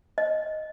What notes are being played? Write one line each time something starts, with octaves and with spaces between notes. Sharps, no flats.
D#5